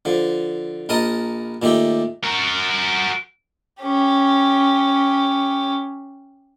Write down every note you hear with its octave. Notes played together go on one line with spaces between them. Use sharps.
D3 F3
A#1 A#4 D#5 A5 D#6
A#2 D#3 A3 G4
F#4 A#4
C#4 G4